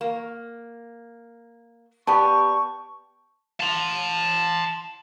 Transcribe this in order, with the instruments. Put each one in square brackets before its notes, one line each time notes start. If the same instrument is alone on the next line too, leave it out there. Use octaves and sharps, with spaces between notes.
[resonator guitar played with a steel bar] A#3
[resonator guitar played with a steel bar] B3 G4 D5 [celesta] A5 [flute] C#6
[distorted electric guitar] A5 C6